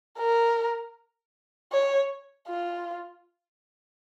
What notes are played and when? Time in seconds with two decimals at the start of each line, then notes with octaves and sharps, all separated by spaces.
0.18 A#4
1.72 C#5
2.48 F4